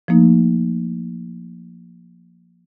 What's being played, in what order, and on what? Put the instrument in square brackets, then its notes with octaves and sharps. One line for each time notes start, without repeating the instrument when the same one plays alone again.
[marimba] F3 A3 A#3 D#4